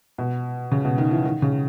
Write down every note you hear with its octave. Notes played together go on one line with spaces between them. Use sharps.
B2
C#3
B2
D#3
E3
D#3
C#3